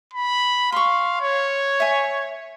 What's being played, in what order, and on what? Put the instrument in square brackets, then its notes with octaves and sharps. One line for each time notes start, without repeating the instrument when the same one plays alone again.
[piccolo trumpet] B5
[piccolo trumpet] F5 [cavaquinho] C6 C#6
[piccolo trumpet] C#5
[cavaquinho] E5 G#5